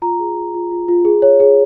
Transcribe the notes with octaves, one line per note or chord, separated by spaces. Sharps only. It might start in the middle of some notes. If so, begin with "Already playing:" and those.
F4 A#5
G#4
F4
F4
F4
F4
G#4
C#5
G#4